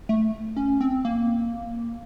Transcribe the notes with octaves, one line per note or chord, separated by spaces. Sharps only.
A3
C#4
C4
A#3